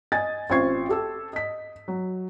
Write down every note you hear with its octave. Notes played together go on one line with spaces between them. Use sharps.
D#5 G#5 G#6 A6
A1 C4 F4 C#6 G#6 C7
G4 A4 E6
D#5 B6
F#3